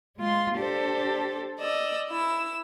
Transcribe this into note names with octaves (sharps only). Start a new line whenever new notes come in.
G#3 F4 C6
D4 G4 A4 C5
D5 D#5 E6
E4 E6